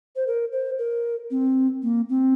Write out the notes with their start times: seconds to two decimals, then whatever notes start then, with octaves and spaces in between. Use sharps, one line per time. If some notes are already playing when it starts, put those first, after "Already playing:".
0.16 C5
0.27 A#4
0.52 C5
0.79 A#4
1.31 C4
1.83 A#3
2.09 C4